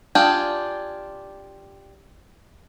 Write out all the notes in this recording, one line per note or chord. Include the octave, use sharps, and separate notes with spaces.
D4 F4 G4 G#4